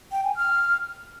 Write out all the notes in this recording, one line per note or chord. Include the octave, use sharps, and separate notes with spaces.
G5
G#5
F6